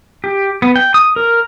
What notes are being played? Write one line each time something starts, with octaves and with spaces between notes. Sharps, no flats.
G4
B3
G5
D#6
A#4